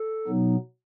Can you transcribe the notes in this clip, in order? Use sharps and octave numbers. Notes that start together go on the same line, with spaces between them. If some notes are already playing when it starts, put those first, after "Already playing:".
Already playing: A4
B2 F#3 B3 D#4